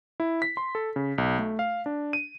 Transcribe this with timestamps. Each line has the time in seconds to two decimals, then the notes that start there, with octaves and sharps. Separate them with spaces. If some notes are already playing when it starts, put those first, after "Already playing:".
0.20 E4
0.42 B6
0.57 C6
0.75 A4
0.96 C#3
1.18 B1
1.39 A3
1.59 F5
1.86 D4
2.13 D#7